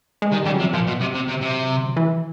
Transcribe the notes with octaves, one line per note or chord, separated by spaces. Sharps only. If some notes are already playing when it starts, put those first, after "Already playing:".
G#3
D#3 G3
C#3 G3
F#3
C3 F3
A#2 F3
B2 F#3
C3
C3
C3
C3
E3